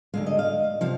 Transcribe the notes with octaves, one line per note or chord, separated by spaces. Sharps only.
D2 D3 G#3 F5
D#5
F5
C3 F3 F5